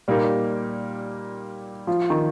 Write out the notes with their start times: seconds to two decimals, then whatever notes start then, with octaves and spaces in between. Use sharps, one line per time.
0.08 A#2 G3 A#3 D#4 A#4
1.87 F3
2.10 D#3